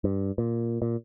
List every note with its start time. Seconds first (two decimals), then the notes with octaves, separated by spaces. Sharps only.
0.04 G2
0.38 A#2
0.82 A#2